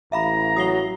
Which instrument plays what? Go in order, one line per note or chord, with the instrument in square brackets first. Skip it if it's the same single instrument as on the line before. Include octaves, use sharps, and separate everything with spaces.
[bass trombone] A1 [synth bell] E5 F5 B5 [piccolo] A#5
[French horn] F#3 [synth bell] D#6 C7 G7